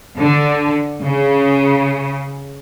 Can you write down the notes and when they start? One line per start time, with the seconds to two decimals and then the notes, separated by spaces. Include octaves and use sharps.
0.17 D3
1.02 C#3